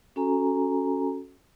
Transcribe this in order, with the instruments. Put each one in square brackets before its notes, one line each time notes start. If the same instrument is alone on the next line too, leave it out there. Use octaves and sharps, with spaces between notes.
[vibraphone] C#4 F#4 A4 G#5 A#5